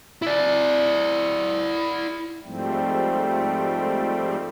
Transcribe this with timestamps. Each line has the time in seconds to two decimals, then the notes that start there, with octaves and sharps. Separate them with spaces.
0.22 E4 D5
2.44 G#2 F3 G3 A3 C4